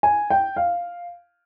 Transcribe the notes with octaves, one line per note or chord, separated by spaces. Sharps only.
G#5
G5
F5